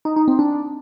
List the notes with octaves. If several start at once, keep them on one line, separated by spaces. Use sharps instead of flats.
D#4
D#4
C4
D4